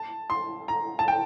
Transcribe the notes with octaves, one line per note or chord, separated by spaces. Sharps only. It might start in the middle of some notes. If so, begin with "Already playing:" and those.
Already playing: A5
C6
A#5
A5
G5